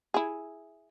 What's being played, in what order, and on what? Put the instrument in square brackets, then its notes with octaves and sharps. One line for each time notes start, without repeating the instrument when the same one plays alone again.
[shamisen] E4 G#4